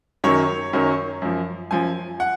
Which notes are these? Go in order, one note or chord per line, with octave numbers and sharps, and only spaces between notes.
F#2 D#3 F#3 C#5
F#2 D#3 F#3
F#2 F3
F#2 F3 G#5
F#5